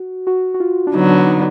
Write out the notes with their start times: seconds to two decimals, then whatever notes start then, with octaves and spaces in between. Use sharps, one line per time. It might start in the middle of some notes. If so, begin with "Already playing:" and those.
Already playing: F#4
0.27 F#4
0.54 F#4
0.60 F4
0.87 D4
0.94 D3 F#3 B3 D#4
1.10 D4
1.27 D#4